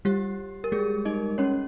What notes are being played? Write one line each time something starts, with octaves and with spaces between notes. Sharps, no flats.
G3 G4
A#4
G#3 G#4
D#4 D#5
C#4 C#5